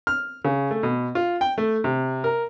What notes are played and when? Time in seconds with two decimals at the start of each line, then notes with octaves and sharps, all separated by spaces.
0.07 F6
0.45 C#3
0.71 A3
0.83 B2
1.15 F4
1.41 G5
1.58 A3
1.84 C3
2.24 A#4